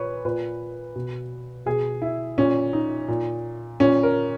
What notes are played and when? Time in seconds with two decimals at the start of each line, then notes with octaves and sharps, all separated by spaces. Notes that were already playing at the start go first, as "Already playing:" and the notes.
Already playing: A#2 B4 C#5
0.25 A#2 B4
0.96 B2
1.66 B2 G#4
2.02 E4
2.38 A#2 C#4
2.73 D#4
3.08 A#2
3.80 A#2 C#4
4.03 A#4